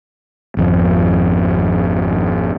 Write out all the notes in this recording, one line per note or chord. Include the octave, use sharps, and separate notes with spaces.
G#1 F2